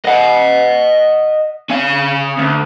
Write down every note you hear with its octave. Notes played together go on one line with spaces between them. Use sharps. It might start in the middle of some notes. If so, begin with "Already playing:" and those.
D#5 F#5
C#4 F5
D2